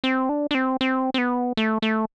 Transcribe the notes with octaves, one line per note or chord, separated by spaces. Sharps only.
C4
D4
D4
C4
C4
C4
B3
A3
A3